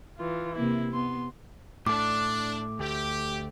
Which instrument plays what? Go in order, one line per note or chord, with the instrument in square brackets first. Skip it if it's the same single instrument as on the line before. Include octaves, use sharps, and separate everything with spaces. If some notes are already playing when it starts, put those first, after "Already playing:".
[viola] E3 F4
[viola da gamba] C3 A#3 [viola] E4
[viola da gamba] B3 [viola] C6
[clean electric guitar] A2 A3 [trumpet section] D4 [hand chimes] D6
[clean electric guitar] D2 A3 [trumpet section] G4